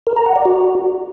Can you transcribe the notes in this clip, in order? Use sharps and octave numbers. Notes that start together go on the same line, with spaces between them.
A#4
A#5
F#5
D5
F#4